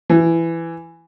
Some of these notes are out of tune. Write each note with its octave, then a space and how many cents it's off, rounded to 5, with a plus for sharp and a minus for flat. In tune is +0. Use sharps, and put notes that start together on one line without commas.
E3 +20